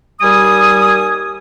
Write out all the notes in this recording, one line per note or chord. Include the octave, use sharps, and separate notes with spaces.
D#2 G3 G4 G#5 D#6